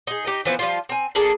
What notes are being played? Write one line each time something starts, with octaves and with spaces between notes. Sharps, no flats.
D#4 G#4
D#4 G4 A#4 D#5
E3 F3 B3
F3 G3 F4
C4 G#5
A#3 D4 G#4 A4